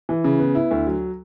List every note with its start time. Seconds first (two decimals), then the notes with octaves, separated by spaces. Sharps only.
0.09 E3
0.24 C#3
0.40 B3
0.55 E4
0.71 D2
0.87 F#3